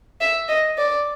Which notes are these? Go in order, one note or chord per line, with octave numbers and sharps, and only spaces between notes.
E5
D#5
D5